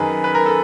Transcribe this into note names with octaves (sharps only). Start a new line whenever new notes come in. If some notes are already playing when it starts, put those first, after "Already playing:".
Already playing: F#2 D#3 G#4 A#4 B4
B4
A#4
A4